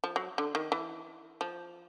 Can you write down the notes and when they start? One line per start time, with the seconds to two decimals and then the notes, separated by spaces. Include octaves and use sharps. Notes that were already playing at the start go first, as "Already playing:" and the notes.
0.04 F3
0.16 F#3
0.38 D3
0.55 D#3
0.72 E3
1.41 F3